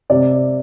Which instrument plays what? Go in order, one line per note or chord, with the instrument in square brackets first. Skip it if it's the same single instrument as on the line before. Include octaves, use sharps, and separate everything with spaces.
[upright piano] C3 D5